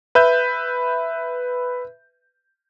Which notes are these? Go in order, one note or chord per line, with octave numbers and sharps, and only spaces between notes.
B4 E5 G6